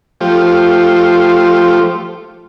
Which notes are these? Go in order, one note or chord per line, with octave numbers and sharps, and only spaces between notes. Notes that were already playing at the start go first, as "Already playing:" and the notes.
F3 A3 F4 G4 C5